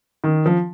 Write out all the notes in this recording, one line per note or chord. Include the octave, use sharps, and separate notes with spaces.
D#3
F3